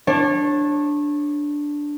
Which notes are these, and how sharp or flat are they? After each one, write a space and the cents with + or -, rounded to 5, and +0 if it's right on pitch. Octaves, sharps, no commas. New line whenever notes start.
D4 +0 C#5 -25